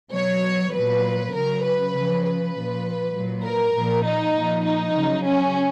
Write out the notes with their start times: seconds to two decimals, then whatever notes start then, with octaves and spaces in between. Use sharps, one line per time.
0.12 B2 F#3 C#5
0.72 F#3 B4
0.77 A#2
1.33 C#3 F#3 A#4
1.63 B4
1.94 C#3 F3
2.24 B4
2.54 A#2 F3
3.14 A#2 F#3
3.43 A#4
3.74 A#2 F3
4.04 D#4
4.35 A#2 F3
4.64 D#4
4.94 C#3 F#3
5.24 C#4